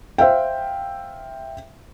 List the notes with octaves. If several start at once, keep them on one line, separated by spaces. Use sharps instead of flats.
C5 E5 F5 G5